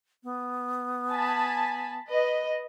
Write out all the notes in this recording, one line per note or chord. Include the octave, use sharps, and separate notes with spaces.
B3
G#5 A5 B5
B4 D#5